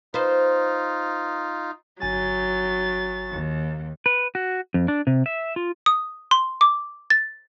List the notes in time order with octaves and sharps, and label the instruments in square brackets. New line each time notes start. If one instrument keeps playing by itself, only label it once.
[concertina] D#4 F4 [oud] B4 C5
[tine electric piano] G1 G#5 [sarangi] F#3 [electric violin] A6
[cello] D#2
[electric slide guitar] B4
F#4
F2
D4
C3
E5
F4
[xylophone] D#6
C6
D6
A6